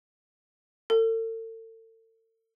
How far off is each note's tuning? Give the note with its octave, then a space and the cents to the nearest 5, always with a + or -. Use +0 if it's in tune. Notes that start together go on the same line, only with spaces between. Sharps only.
A4 +40